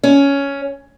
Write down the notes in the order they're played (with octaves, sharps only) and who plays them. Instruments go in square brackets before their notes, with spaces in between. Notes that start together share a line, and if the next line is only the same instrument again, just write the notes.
[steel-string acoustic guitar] C#4